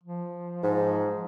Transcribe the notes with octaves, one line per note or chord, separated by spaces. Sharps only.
F3
G#2